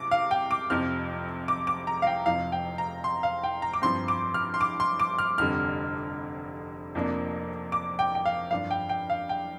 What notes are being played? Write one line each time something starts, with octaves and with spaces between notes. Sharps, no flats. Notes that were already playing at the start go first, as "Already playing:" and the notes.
Already playing: C2 C3 D6
F5
G5
D6
F1 F2 C3 F3 C4 F6
D6
D6
A#5
F5
G5
F1 F2 F3 F5
G5
A#5
C6
F5
G5
A#5
D6
G2 F3 C4 C6
D6
F6
C6
D6
C6
D6
F6
F1 F2 D3 G3 F6
F1 F2 F3 A#3 D4
D6
G5
G5
F5
G2 F3 D4 F5
G5
G5
F5
G5